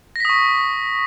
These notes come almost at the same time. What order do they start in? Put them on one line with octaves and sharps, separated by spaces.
A#6 B6 D#6 C#6